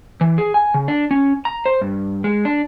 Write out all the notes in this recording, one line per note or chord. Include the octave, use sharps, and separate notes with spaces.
E3
G#4
G#5
C#3
D4
C#4
A#5
C5
G2
G#3
D4